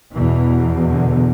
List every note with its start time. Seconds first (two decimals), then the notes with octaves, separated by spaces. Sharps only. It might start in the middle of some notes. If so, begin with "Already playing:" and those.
0.14 E2 B2 E3
0.89 D3